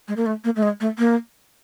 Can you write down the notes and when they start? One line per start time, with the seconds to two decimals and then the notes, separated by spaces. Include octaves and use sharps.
0.08 G#3
0.17 A#3
0.26 A3
0.44 A#3
0.56 A3
0.63 G#3
0.81 A3
0.99 A#3